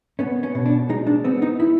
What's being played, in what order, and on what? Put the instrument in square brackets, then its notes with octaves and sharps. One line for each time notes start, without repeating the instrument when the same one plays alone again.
[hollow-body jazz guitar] B3 C#4
C#4
B2
D4
G#3 D#4
D4
B3 C4
D#4
E4